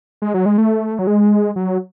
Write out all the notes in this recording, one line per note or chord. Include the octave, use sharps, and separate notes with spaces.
G#3
F#3
G#3
A3
F#3
G#3
F#3